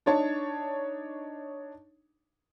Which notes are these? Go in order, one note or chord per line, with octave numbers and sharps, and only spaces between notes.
D4 D#4 C#5 A5